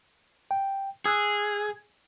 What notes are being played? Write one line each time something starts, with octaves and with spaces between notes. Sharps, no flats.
G5
G#4 D#6 E6 F#6